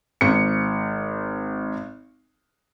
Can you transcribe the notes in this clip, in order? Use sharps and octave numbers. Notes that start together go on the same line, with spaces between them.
G#1 C#7